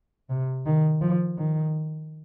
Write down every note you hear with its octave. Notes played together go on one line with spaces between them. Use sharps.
C3
D#3
F3
D#3